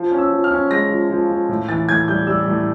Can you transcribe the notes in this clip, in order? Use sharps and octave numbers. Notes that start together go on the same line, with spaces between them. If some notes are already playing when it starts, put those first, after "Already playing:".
Already playing: F3
C#4
E6
F3
F6
C#4
G#3 A#6
F3
F3
F3
A2
E3 A6
A2 G#6
G3 G6
G3 E6
A2